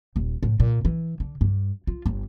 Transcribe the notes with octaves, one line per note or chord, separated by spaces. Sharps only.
D#1
A2
A#2
E3
D3
G2
F4
G1